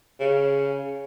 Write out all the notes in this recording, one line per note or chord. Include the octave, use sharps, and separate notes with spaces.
C#3